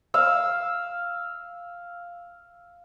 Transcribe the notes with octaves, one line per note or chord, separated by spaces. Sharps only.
F5 E6